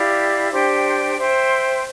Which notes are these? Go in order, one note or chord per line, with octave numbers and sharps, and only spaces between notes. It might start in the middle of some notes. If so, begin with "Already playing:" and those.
Already playing: E4 G4 D5 F5
D4 G4 C5 G5
C5 E5 G5